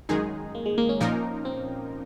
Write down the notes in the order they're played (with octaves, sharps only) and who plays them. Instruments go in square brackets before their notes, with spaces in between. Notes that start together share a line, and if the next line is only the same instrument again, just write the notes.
[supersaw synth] F#2 D#3 G#3 D#4 G#4
[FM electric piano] A#3
G#3
A#3
C#4
[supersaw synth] A#2 F3 A#3 D#4 A#4
[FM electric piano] C4